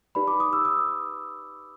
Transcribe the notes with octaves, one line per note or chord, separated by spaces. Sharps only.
D#4 G4 B4 D5 B5
D6
D#6
E6
D#6